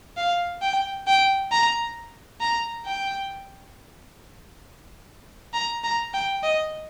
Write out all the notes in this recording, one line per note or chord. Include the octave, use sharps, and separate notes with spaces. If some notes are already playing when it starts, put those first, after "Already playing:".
F5
G5
G5
A#5
A#5
G5
A#5
A#5
G5
D#5